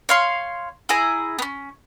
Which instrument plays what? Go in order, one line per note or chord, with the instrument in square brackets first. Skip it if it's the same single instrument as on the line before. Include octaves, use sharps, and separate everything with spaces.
[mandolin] C#5 F5 C6
E4 G#4 G#5 A#5
B3 C#4